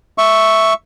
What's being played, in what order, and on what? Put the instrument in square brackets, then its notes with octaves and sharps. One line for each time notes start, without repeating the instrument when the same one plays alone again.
[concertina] E5 C#6